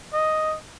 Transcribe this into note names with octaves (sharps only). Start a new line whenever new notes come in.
D#5